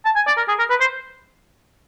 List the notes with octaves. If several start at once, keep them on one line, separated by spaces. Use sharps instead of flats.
A5
G#5
D5
A#4
G#4
A#4
B4
C5